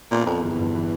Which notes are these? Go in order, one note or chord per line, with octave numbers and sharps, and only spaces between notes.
A#2 B3
F2 F3
G1 E2
G2
E3